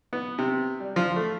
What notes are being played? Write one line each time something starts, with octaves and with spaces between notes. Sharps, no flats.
B3
C3
G3
F3
A3